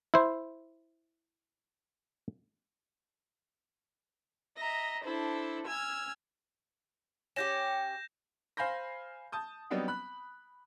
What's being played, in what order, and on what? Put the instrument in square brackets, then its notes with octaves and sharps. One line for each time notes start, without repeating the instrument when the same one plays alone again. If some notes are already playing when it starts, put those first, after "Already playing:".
[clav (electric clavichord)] E4 C5
[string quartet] D#5 E5 A#5
D4 E4 A4 C5
G#5 E6 F6 G#6
[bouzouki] C#4 F4 G4 [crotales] G6 A#6 E7
[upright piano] C5 F5 G#5 B5 G6 A#6
A5 D#6 G6
F#3 G3 B3 C4 D4 D#4
B5 F#6